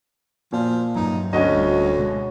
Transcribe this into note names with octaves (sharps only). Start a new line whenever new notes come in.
A#2 F3
G2 F#3 D#4
D2 C#4 F#4 D#5
D1 G3
B2 G#3